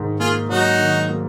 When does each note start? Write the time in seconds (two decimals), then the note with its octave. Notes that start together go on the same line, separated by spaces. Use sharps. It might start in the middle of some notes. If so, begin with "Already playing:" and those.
Already playing: G#2 D#3
0.20 A#3 F4 G#4
0.49 F#3 D#4 F#4
0.79 D#3
1.09 A#3